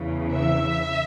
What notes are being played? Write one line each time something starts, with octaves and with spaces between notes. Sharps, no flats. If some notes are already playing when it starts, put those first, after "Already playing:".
Already playing: E2 C#3 E3
E5